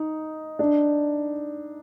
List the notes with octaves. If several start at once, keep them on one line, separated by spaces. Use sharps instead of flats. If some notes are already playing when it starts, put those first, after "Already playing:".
Already playing: D#4
D4